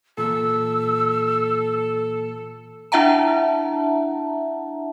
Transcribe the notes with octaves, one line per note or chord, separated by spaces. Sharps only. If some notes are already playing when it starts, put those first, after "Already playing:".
A#2 E3 A#3 A4 E6
D4 E4 E5 F#5 A5 A#5